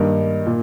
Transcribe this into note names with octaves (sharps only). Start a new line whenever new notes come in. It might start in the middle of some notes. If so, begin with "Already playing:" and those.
Already playing: G2 D#3 A#3 D#4
A#2